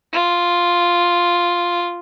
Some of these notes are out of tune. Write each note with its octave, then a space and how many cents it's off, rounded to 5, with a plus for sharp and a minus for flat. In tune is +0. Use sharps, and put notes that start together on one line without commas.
F4 +0